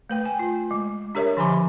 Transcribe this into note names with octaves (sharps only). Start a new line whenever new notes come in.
A3 B4 G5
G#5
F4
G#3
D4 G4 A#4 C#5 D#5 E5
D3 F3 G#5 A#5 B5 D6